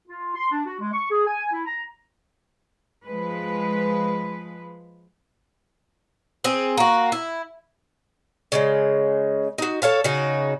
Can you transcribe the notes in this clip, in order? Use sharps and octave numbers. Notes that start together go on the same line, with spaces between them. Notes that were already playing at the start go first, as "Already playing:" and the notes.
F4
C6
D4
F#4
G#3
C#6
G#4
G#5
E4
A#5
F3 G#3 B4
C4 G#4
A#3 F#4
E4
C#3 F#3 G#3
D#4 F#4
A4 C#5 F5 A5
C#3 D#4 F#4